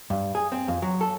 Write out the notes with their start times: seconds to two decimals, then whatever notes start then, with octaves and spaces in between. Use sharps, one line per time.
0.10 G2
0.35 G#4
0.52 C4
0.68 F2
0.82 F#3
1.01 A4